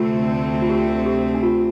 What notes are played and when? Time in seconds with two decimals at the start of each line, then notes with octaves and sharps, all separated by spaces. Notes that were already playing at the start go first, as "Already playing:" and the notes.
Already playing: D2 C3 A3 C4 F4
0.62 F4
0.70 G4
1.06 G4
1.34 D4
1.43 F4